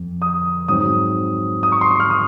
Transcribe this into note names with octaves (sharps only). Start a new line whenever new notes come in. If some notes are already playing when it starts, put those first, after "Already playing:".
Already playing: F2 C4
D#6
G#2 F#3 C4 D#6
D#6
C#6
C6
C#6
F6
D#6